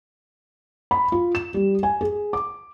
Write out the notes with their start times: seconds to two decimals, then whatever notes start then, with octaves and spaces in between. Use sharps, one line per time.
0.91 B5
1.12 F4
1.35 E7
1.54 G3
1.83 G#5
2.01 G#4
2.33 D6